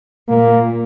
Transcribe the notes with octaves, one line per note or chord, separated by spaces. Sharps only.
A#2 A#3